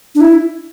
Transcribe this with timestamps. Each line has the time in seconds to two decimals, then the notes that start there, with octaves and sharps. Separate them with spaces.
0.15 D4
0.21 E4